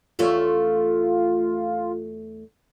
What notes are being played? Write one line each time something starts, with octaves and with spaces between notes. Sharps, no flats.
E2 A3 C#4 F4